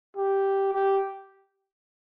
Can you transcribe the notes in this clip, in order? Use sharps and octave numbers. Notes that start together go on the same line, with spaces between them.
G4
G4